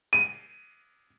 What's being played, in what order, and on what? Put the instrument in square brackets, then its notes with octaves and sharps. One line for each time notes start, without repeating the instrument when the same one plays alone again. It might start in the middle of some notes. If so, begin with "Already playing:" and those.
[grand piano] D#7